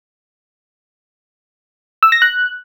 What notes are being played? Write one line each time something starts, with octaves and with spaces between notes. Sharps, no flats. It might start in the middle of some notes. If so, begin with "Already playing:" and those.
E6
A#6
F#6